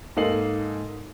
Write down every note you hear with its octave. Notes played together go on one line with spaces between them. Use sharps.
G#2 A#3 A4 D#5 C7 F#7